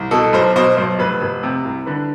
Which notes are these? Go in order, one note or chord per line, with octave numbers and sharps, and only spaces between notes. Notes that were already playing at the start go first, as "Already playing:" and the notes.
Already playing: C2
B2 A4
B1 C5
B2 C5
B1 C5
F1 B4
F1
C3
C2
D3 B4